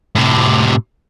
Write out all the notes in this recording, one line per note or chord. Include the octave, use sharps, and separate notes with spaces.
A2 C3